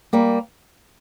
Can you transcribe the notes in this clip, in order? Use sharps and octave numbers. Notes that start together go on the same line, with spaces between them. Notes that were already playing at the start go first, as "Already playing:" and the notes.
G3 A#3